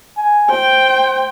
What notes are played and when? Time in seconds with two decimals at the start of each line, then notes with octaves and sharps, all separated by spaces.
0.17 G#5
0.50 C5 G5